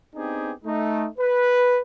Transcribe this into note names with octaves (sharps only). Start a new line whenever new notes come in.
B3 C4 D4 D#4 G4 G#4
A3 D#4
B4